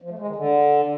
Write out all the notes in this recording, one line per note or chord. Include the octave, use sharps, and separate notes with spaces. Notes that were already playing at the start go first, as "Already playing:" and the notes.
F3
A3
G#3
D#3
D3